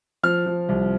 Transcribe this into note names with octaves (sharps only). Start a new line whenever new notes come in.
F3 F6
F3
C2